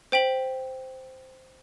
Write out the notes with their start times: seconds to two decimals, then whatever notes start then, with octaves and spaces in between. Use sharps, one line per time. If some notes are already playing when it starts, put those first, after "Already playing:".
0.12 C5 G5 B6 F#7